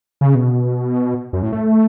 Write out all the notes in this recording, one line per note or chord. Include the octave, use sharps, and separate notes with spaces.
C#3
B2
F#2
A2
A3